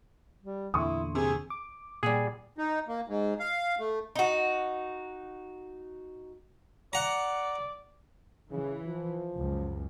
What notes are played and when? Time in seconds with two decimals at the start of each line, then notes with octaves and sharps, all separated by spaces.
0.43 G3
0.74 E2 A#2 D3 E4 C6 C#6 D#6
1.15 C3 G#4
1.50 D6
2.03 A#2 G3 G#4 E5 F#5
2.58 D#4
2.88 A#3
3.07 G#2
3.40 F5
3.79 A3
4.15 D#4 F#4
6.93 D5 F#5 A#5
8.51 C#3 E3
8.86 F3
9.37 C#2 F#2